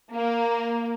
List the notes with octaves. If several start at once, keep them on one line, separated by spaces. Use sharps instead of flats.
A#3